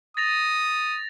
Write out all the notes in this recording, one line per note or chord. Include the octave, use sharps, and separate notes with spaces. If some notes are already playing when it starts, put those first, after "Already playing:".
D#6 A6 A#6 F7